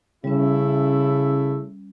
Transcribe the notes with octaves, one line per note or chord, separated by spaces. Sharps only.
C#3 G3 A3 C#4 E4